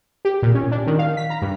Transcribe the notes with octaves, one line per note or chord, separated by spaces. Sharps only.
G4
A#2
C#4
D4
D#3
F5
B6
A#5
G2